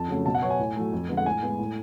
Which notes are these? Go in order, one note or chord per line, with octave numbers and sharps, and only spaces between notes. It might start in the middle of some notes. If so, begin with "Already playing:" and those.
Already playing: F2 A5
C#3 F#3 A3
B2 A5
F#5
F#3 B3 C#5
G#5
A2
F#3 A3
F2
D3 G#3 B3
F#5
A2 G#5
G#3 B3
A2